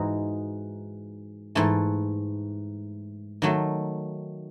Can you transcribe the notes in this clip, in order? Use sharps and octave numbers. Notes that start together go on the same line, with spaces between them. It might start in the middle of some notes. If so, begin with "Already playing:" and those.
Already playing: G#2 E3 G#3 D#4 F#4
G#2 E3 A3
D#3 F#3 A3